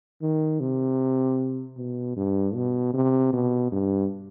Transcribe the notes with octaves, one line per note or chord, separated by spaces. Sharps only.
D#3
C3
B2
G2
B2
C3
B2
G2